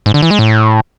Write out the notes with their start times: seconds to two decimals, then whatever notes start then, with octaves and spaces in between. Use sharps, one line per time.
0.06 G#2
0.14 D3
0.22 E3
0.31 G#3
0.39 A2